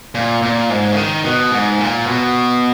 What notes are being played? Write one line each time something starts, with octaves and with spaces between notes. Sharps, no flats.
A#2
A#2
G#2
C#3
D#3
B2
G#2
A#2
B2